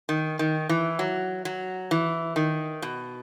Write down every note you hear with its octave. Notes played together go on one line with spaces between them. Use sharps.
D#3
D#3
E3
F#3
F#3
E3
D#3
B2